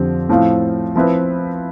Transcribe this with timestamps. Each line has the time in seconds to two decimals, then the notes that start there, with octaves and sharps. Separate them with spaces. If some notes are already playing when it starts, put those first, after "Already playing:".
Already playing: F2 D3 F3 C4 G4
0.29 A2 F3 C4 F4
0.96 F3 C4 E4 B4